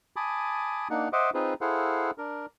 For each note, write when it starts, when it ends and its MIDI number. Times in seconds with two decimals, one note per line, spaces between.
0.16 0.88 80
0.16 0.88 81
0.16 0.88 83
0.16 0.88 86
0.16 0.88 87
0.90 1.08 58
0.90 1.08 62
0.90 1.08 63
0.90 1.08 78
1.13 1.30 72
1.13 1.30 75
1.13 1.30 76
1.13 1.30 78
1.13 1.30 86
1.34 1.54 60
1.34 1.54 63
1.34 1.54 65
1.34 1.54 68
1.34 1.54 71
1.34 1.54 72
1.61 2.11 64
1.61 2.11 68
1.61 2.11 69
1.61 2.11 72
1.61 2.11 77
1.61 2.11 78
2.18 2.46 62
2.18 2.46 70